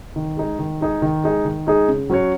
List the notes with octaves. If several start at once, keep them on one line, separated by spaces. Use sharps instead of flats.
D#3
G#3 D#4 G#4
D#3
G#3 D#4 G#4
D#3
G#3 D#4 G#4
D#3
G#3 D#4 G#4
C#3
F#3 C#4 F#4 C#5